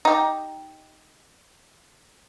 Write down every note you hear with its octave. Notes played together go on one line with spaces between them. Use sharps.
D#4 G4